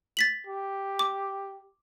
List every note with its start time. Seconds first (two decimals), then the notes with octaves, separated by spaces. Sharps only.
0.17 A6 B6 F#7
0.47 G4
0.99 D6